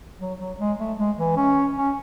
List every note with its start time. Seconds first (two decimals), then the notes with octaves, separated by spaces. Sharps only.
0.20 F#3
0.39 F#3
0.59 G#3
0.79 A3
0.98 G#3
1.18 E3
1.37 C#4
1.77 C#4